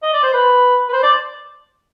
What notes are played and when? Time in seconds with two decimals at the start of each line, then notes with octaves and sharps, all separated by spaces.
0.02 D#5
0.13 D5
0.23 C5
0.34 B4
0.89 B4
0.93 C5
1.03 D5